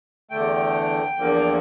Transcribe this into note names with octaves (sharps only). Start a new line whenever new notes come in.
E2 D3 A3 G5
E2 D3 F3 A#3